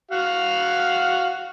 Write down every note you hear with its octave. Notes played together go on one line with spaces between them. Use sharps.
F#4 F5 F#5